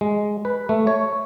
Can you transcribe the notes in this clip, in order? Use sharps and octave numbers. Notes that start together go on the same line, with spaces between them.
G#3
B4
A3
C#5